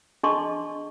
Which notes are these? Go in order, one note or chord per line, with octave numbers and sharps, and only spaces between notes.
D4 G#4 D#5 A5 C6 C#6